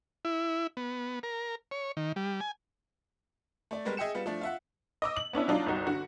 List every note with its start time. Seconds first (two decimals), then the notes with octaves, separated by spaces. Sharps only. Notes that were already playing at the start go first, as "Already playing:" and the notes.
0.25 E4
0.77 B3
1.23 A#4
1.71 C#5
1.97 D#3
2.16 G3
2.41 G#5
3.71 A3 D5
3.85 G3 G#3 B3 A#4
3.97 G#4 D#5 E5 G5 C#7 E7
4.14 G3 B3 F4
4.26 F3 A3 D4
4.41 F4 E5 F#5
5.02 D#5 D6 E6
5.16 F#7
5.33 B3 C#4 D4 E4
5.48 F#3 D4 D#4 F4
5.66 G1 C2 D#4 F#4
5.87 D3 F#4